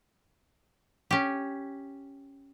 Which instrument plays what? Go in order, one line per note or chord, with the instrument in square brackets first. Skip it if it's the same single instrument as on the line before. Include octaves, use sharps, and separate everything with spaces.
[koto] C#4 G4